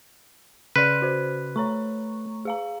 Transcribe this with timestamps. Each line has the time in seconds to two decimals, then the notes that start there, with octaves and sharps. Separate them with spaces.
0.76 C#3 B4 D5 C6 F6
1.02 F#4 C5
1.56 A3 C#5 A#5 C#6
2.45 G#4 F5 A#5